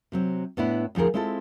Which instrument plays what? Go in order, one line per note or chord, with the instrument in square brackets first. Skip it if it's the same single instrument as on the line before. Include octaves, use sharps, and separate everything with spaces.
[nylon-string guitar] C3 F#3 C4
A2 B3 D4 E4
D2 F3 D#4 G#4 A#4
G#3 C4 E4 F4 A4